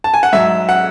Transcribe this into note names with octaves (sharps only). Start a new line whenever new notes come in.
A5
G#5
F#5
G#2 F#3 E5
F#5